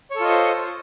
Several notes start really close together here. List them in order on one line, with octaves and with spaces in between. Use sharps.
C#5 A4 F4 D#5 C5